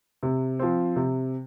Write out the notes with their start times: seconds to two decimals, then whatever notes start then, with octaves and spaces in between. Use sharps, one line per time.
0.23 C3
0.59 F3 C4
0.96 C3